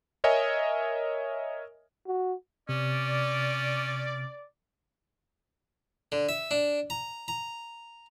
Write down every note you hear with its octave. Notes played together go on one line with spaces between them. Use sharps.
A#4 C#5 D#5 E5 G#5
F#4
C3 C#4 D5
D3
E5
D4
A#5
A#5